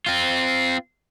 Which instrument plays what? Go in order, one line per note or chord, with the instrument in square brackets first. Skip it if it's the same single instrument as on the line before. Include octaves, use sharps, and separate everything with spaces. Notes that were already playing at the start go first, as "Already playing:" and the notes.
[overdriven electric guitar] C4 F4